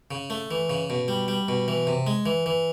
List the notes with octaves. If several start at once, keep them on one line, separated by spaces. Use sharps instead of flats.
C#3
A3
E3
C#3
B2
G3
G3
B2
E3
C3
G#3
E3
E3